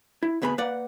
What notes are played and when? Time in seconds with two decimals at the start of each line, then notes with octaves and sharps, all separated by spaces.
0.23 E4
0.42 D2 B2 B3 G#4 B5
0.58 A#3 B4 D5 F#5